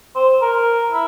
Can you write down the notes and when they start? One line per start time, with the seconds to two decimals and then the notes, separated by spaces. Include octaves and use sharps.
0.16 C5
0.42 A#4
0.92 E4